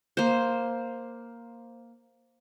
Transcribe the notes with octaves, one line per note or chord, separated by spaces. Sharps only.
A#3 C5